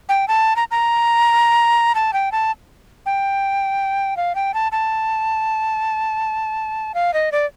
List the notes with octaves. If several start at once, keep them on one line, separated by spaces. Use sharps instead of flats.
G5
A5
A#5
A#5
A5
G5
A5
G5
F5
G5
A5
A5
F5
D#5
D5